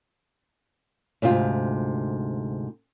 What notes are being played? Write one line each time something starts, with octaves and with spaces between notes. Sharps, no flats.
D2 G#2 C3 F4